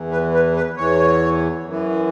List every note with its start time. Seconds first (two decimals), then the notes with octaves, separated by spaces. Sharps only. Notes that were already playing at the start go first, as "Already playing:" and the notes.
Already playing: E2 E3
0.12 B4
0.34 B4
0.56 B4
0.77 E2 E3 C#5
1.65 F#2 E3